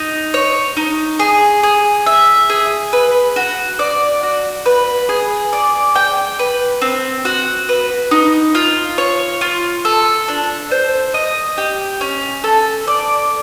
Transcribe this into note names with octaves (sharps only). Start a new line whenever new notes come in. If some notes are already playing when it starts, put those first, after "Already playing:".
Already playing: D#4
C#5
D#4
G#4
G#4
E5
G#4
B4
F#4
D5
F#4
B4
G#4
D5
G5
B4
C4
F#4
B4
D#4
F4
C#5
F4
A4
D4
C5
D#5
G4
C#4
A4
D5